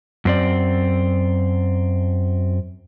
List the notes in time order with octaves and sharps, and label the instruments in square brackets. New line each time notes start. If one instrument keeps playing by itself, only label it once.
[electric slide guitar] F#2 C4 D5